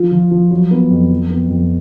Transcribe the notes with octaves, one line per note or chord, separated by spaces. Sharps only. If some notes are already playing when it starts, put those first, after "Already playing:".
Already playing: F3 F4
F3
F3
F#3
B3
F2
F3
B3
F2